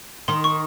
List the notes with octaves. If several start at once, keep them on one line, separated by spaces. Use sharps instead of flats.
D#3 C6
C#6